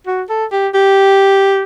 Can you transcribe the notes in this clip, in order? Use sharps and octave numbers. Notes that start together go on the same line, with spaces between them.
F#4
A4
G4
G4